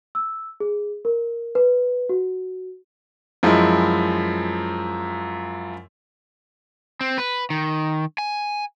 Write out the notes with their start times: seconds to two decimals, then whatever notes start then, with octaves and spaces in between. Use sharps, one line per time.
0.15 E6
0.60 G#4
1.05 A#4
1.55 B4
2.09 F#4
3.43 F#2 F3 G#3 E4
7.01 C4
7.18 B4
7.50 D#3
8.18 G#5